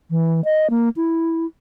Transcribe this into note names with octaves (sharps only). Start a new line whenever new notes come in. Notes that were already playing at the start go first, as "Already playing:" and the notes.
E3
D#5
A#3
E4